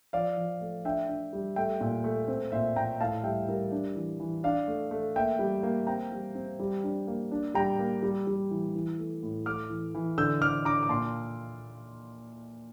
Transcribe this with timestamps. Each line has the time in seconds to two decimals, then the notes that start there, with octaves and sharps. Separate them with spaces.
0.13 F3 D5 F5
0.37 F3
0.61 A3
0.85 D4 E5 G5
1.09 D4
1.33 G3
1.56 A3 E5 G5
1.81 A#2
2.04 A3
2.28 C4
2.52 A#2 C5 E5
2.76 A#2 G5 A#5
3.01 A2 F5 A5
3.24 G3 E5 G5
3.49 G3 A#4
3.71 D4
3.95 E3
4.20 E3
4.44 D4 D5 F5
4.68 A3
4.91 A3
5.16 A#3 E5 G5
5.39 G3
5.63 A#3
5.87 C4 G5 A#5
6.12 G3
6.35 C4
6.60 G3
6.84 D4
7.07 A#3
7.31 D4
7.54 G3 G5 A#5
7.79 A#3
8.03 G3
8.27 G3
8.51 E3
8.75 E3
8.99 A3
9.23 A2
9.46 A3 D6 F6
9.69 E3
9.95 E3
10.18 D3 E6 G6
10.41 D3 D6 F6
10.65 D4 A#5 D6
10.83 D6
10.89 A#2 A5 C6